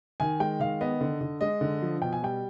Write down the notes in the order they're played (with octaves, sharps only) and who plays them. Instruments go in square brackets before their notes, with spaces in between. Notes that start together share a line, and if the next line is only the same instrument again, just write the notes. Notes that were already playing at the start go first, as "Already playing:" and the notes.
[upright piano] D#3 G#5
G#3 G5
D#3 F5
B3 D#5
D3
D3
G#3 D#5
D3
F3
B2 G5
G#5
G3 G5